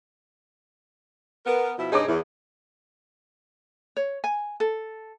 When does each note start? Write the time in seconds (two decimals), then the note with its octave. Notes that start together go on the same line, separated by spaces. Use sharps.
1.46 B3 A#4
1.78 B2 F3 E4
1.92 G2 C3 D#4 G#4 C#5 D6
2.08 E2 E4
3.97 C#5
4.24 G#5
4.60 A4